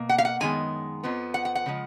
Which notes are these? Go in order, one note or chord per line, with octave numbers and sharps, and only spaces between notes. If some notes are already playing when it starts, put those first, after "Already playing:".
Already playing: B2 A#3
F#5
F5
F#5
F#2 D#3 G#3 B3 G#5
F2 F3 B3
F#5
F#5
F#5
C#3 F3 G#3